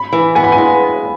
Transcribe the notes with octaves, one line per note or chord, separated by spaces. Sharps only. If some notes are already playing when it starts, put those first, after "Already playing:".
Already playing: B5
E3
B3 G#5
B5
G#5
G#3